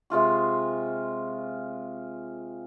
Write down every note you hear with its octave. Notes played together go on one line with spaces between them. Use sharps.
C3 G#3 F4 C#6